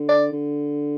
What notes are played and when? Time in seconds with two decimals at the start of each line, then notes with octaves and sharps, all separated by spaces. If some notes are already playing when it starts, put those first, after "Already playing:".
Already playing: D3
0.09 D5
0.32 D3